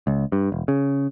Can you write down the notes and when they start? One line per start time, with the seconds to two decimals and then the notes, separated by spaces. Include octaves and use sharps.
0.07 C#2
0.32 G2
0.52 E1
0.68 C#3